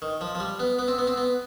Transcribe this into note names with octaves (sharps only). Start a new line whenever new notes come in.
D#3
F3
F3
G3
B3
B3
C4
B3
C4
B3